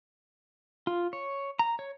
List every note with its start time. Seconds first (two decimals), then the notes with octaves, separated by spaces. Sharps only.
0.87 F4
1.13 C#5
1.59 A#5
1.79 C#5